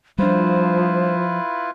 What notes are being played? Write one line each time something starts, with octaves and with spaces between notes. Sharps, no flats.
F3 G3 D4 E4 F4 B4 C5